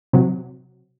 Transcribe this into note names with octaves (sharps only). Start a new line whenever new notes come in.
C3 F#3